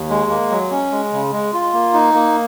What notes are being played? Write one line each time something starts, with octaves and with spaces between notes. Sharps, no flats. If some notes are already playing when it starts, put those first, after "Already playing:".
Already playing: D#2
G#3
A#3
F#3
C#4
G#3
C#3
G#3
F4
A#3
D#4
A#3